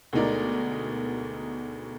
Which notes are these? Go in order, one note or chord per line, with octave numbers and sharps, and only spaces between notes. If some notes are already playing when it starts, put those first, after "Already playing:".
D2 B2 G#3 D#4 A#4 D5